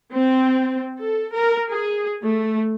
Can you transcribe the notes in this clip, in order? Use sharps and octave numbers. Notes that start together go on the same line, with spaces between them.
C4
A4
A#4
G#4
A3